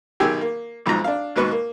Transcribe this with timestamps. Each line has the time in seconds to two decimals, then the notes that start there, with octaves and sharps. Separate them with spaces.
0.20 B1 D#3 G4 G#4 G#5 E6
0.41 A#3
0.86 B1 F2 G#2 A#5
1.04 D4 F5
1.36 D#2 G#2 B2 B4 C#6
1.51 A#3